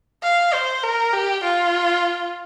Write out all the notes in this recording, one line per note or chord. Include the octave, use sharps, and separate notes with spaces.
F5
C5
A#4
G4
F4